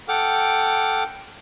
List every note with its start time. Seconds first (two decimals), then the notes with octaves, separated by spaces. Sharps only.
0.08 A4 F#5 G5 D6 F6